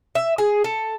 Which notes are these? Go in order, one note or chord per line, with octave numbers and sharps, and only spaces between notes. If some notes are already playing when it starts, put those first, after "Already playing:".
E5
G#4
A4